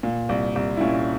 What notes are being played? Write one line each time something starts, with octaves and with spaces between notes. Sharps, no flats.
A#2
C2
C2
E4
A#2 C#4